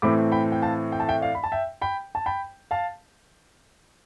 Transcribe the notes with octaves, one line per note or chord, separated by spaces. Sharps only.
A2 E3 A3 C4 B5 D6
G5 B5
G5
F5 A5
G5
A5
E5 G5
D5 F5
B5
A5
E5 G5
G5 B5
A5
G5 B5
F5 A5